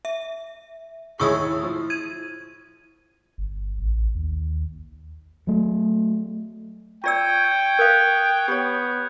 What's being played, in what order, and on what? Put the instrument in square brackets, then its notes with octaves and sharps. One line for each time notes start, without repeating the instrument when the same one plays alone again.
[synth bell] E5
[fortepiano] D#2 A2 C#5 [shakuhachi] G#4 [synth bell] C#6 D#6 E6
[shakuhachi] E4
[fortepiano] F3
[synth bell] G#6 D#7
[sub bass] G1
A1
D#2
[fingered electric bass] F#3 A3
[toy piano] F4 D5 E6 [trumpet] G5 [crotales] C#6 G#6 C#7
[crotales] G6 G#6 C#7
[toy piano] A#4 F5 [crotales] D#6 F#6 C#7
[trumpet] B3 [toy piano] G4 C#5